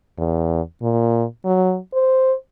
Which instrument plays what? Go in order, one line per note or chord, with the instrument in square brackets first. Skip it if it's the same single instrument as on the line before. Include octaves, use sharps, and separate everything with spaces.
[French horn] E2
A#2
F#3
C5